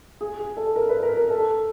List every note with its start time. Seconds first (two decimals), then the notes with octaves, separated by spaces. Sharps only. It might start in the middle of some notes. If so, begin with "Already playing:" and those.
0.21 G#4
0.39 G#4
0.57 A4
0.76 A#4
0.89 B4
1.03 A#4
1.17 A#4
1.30 A4